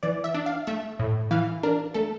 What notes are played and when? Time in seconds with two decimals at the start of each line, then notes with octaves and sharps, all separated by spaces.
0.03 E3 D5
0.24 E5
0.34 D4
0.46 F5
0.67 A3 E5
0.99 A2
1.31 E3 F5
1.63 D4 A#4
1.94 A3 A4